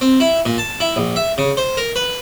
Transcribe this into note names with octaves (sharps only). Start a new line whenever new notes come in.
C4
E4
A#2
A5
E4
A#1
E5
C#3
C5
A#4
B4